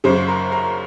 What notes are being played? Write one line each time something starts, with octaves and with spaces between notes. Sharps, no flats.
F#1 F#2 C#3 C5
A#4
A#4